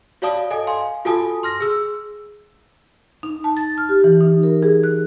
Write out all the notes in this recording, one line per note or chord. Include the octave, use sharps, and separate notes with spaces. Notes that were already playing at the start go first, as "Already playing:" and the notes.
F#4 C#5 D5 F5 A5 D#6
A4 D#5 G#5
F5 G#5 C6
F4 F#4 A4 G#5 A5 D#6
C6 F6 A#6
G#4 E6
D#4
A5
A6
F6
G4
E3
D#4
A#4
G#4
F#6